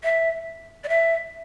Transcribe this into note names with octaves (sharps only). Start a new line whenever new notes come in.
E5
D5
E5